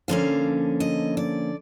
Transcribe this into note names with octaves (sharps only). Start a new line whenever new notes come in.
D3 F3 A#3 C#4 F5
D#5
D5